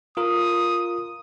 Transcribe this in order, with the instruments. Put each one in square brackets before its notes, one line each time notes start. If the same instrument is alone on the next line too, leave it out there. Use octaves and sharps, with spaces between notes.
[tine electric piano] F4 A#4 [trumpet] D#6